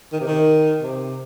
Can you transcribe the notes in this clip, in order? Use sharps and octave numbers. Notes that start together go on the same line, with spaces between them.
D#3
C3
D#3
C3